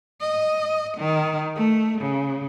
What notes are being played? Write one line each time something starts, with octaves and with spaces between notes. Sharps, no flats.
D#5
D#3
A3
C#3